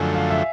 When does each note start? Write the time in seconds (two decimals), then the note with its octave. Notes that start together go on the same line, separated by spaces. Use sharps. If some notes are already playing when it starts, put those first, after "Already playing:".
Already playing: F#2 D3 F3 A3 G#5
0.15 F5
0.30 E5